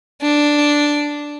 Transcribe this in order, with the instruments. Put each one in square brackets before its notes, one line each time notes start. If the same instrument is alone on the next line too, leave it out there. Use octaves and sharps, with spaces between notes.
[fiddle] D4